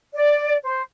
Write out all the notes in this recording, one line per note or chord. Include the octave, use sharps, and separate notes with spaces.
D5
C5